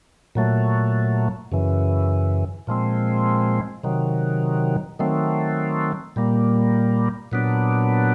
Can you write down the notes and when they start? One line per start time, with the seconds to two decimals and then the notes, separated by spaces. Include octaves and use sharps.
0.35 A#2 F#3 A3
1.52 F#2 C#3 E3
2.67 A#2 F3 G#3 C4
3.84 C3 D#3 F#3
4.99 D#3 F#3 A3 C4
6.16 A#2 G3 A#3
7.32 A#2 F#3 B3 D4